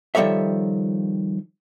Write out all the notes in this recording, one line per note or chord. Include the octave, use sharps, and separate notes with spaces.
D#3 F3 G3 A4 C#5 E5